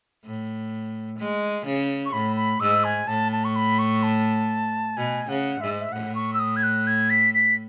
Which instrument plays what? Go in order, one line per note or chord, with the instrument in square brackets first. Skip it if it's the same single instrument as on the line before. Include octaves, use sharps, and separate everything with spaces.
[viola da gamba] A2
G#3
C#3
[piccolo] C#6
[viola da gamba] A2 [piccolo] B5
[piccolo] B5
[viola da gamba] G#2 [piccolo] E6
[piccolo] G#5
[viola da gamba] A2 [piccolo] A5
[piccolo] A5
C#6
B5
C#6
A5
[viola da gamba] B2 [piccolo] G#5
[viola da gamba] C#3 [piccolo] F#5
[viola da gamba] G#2 [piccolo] E5
[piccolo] E5
[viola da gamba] A2 [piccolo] F#5
[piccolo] C#6
E6
D#6
G#6
F#6
G#6
B6
B6